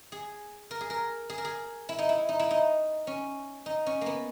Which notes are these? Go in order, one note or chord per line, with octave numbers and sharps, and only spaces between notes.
G#4
A#4
G#4
A#4
G#4
A#4
G#4
E4
D#4
E4
D#4
E4
D#4
C#4
D#4
C#4
A#3 B3